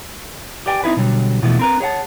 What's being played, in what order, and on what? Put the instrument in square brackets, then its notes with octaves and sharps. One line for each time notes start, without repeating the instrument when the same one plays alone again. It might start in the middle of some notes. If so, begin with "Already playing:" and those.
[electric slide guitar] G4 B4 D5 G5 G#5
C4 D#4 E4 B4
B2 D3 F#3 G3
B2 E3 F3 A3 B3
C4 A#4 B4
G#4 C#5 E5 F#5 A5